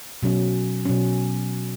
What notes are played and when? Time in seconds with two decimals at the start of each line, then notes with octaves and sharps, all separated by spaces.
0.22 B2 F#3 C#4
0.85 B2 F#3 C#4